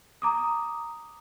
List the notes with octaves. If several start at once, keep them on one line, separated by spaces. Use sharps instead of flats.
A#5 D6 D#6